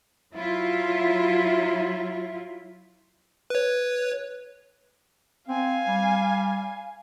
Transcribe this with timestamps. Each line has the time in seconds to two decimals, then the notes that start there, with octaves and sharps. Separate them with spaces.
0.33 F#3 E4 F4
3.50 B4 C#5
5.48 C4 F5 G#5
5.88 G3